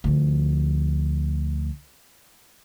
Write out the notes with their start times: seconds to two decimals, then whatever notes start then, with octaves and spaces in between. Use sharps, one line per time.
0.04 D2 F3